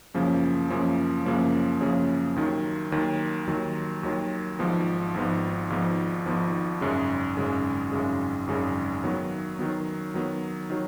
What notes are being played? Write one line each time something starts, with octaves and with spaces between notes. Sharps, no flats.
F#2 C#3 F3 A#3 C#4
F#2 C#3 F3 A#3 C#4
F#2 C#3 F3 A#3 C#4
F#2 C#3 F3 A#3 C#4
D#2 D#3 F#3
D#2 D#3 F#3
D#2 D#3 F#3
D#2 D#3 F#3
G#1 G#2 F3 B3
G#1 G#2 F3 B3
G#1 G#2 F3 B3
G#1 G#2 F3 B3
G#1 F#2 C#3 G#3
G#1 F#2 C#3 G#3
G#1 F#2 C#3 G#3
G#1 F#2 C#3 G#3
D#3 F#3 B3
D#3 F#3 B3
D#3 F#3 B3
D#3 F#3